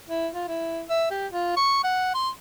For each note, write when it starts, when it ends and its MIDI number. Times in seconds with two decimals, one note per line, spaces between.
0.09 0.28 64
0.34 0.48 65
0.48 0.82 64
0.90 1.08 76
1.11 1.27 67
1.32 1.52 65
1.57 1.81 85
1.84 2.12 78
2.14 2.30 84